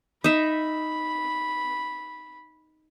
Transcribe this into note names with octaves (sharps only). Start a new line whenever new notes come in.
D#4 E5 B5